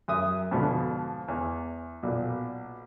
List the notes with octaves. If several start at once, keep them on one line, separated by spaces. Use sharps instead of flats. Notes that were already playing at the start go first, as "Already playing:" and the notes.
F#2 E5 D#6
F2 G#2 B2 D3
E2
B1 A#2